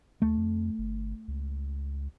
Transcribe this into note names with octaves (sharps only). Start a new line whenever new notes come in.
D#2 A3
F2
G1
C#2